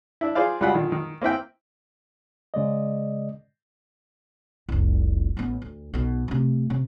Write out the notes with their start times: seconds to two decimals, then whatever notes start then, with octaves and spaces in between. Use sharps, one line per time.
0.21 D4 E4
0.35 F4 G#4 C5 D5 F5
0.60 C#2 G3 F4 F#4 F#5 B5
0.74 A#2 D3 D#3
0.92 D#3
1.22 A#3 C4 E4 G5
2.54 C#3 G#3 D5 D#5
4.69 F1 C2
5.37 A1 B3
5.62 D2
5.94 B1 B2
6.28 C3 A3
6.70 C3